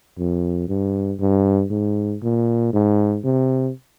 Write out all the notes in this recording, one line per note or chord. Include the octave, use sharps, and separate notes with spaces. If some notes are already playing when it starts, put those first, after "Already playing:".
F2
G2
G2
G#2
A#2
G#2
C3